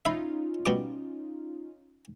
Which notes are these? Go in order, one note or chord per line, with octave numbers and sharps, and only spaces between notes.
C#4 D#4 F4 E5 B5
B2 G3 D6